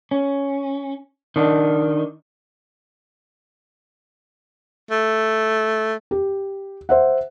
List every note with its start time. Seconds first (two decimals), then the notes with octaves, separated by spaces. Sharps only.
0.11 C#4
1.36 D#3 D4
4.91 A3
6.11 G4
6.89 C5 E5 F#5